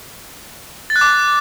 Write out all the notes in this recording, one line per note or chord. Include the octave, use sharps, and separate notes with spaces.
A6
F#6
D6